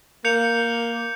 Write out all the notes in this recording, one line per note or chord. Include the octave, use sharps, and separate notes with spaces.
A#3 G6 C#7 F7